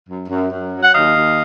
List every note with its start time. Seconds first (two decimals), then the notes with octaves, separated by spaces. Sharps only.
0.08 F#2
0.29 F#2
0.52 F#2
0.73 F#3
0.83 F#5
0.94 D#2 D#5 F5
1.16 D#2